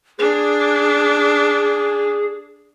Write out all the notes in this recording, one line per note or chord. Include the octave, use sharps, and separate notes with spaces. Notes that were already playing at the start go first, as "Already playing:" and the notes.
D4 G#4